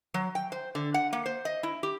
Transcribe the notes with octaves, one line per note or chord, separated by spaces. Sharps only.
F#3
G5
C5
D3
F#5
A#3
C5
D#5
E4
G4